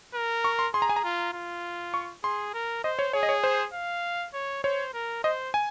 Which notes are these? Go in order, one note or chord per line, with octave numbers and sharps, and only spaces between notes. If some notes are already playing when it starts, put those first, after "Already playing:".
A#4
C#6
C6
G#4 C6
A#5
G#5
A#5
F4
F4
C#6
G#4 C6
A#4
C5 D#5
C#5
G#4 C#5
D#5
C#5
C5
F5
C#5
C5 C#5
A#4
C5 D#5
G#5